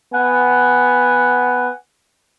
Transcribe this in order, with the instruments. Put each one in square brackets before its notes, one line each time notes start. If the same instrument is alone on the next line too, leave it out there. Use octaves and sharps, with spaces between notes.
[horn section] B3 F#5 G#5